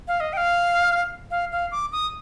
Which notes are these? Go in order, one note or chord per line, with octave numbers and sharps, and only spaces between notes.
F5
D#5
G5
F5
F5
F5
D6
D#6